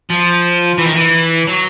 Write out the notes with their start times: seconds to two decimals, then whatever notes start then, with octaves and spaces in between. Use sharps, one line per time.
0.10 F3
0.78 E3
0.87 D#3
0.95 E3
1.47 F#3